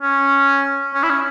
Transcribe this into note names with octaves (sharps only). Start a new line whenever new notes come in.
C#4
C#4
E4
C#4